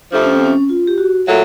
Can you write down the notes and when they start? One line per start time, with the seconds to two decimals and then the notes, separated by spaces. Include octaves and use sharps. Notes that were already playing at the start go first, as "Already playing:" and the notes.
0.12 F2 C3 F3 A3 D4
0.23 C#4
0.34 C4
0.45 C#4
0.69 F4
0.87 G4
0.98 F#4
1.26 A#2 F#3 A3